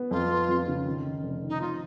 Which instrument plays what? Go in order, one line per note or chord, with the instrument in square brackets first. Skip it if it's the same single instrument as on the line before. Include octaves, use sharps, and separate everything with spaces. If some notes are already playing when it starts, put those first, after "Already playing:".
Already playing: [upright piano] B3
[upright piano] F2 [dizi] F4
[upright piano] B3
F2
C#3
D#3
D#3
F1
D#3
[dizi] D#4
[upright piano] F3 [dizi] F4